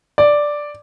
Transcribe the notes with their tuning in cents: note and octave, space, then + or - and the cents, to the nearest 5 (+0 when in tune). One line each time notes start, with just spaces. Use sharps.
D5 +0